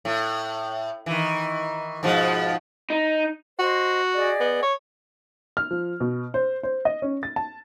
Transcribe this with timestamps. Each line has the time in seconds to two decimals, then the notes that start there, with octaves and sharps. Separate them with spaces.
0.05 A2
1.06 D#3 E3
2.03 G#2 B2 F3
2.90 D#4
3.59 F#4 C5 D#5
4.14 G#4 D5 D#5
4.40 B3
4.63 C#5
5.57 F6
5.71 F3
6.00 B2
6.34 C5
6.63 C5
6.85 D#5
7.02 C#4
7.23 A6
7.36 A5